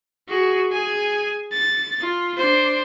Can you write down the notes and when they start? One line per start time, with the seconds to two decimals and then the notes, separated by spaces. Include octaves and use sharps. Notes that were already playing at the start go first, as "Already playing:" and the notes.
0.29 F#4 G#4
0.72 G#4 G#5
1.52 A6
2.01 F4
2.37 D4 C5